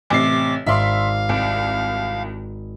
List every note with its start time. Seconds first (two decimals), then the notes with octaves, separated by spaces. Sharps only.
0.10 A1 C3 D6 C7
0.66 G#1 D5 E5 F5 C6
1.29 C2 D5 D7